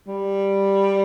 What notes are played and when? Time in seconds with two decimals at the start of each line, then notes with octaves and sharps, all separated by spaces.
0.07 G3